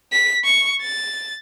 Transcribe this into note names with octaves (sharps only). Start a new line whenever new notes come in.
B6
C#6
A6